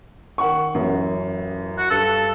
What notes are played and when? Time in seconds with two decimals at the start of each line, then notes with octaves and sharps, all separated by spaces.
0.38 D#3 F#5 C#6
0.75 A1 F#2
1.78 F#4
1.91 G2 A4